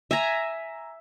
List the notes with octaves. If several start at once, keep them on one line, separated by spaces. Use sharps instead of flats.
E5 G#5 A#5